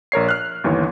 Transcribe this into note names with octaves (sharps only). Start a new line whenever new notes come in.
A#1 A#4 C#5 C7
F6 F#6
G1 D#2 E3 C#5